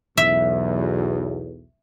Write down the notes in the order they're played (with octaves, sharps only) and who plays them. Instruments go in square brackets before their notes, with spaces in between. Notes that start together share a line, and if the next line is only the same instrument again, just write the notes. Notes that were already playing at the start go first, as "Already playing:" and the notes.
[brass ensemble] B1 E2 [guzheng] E5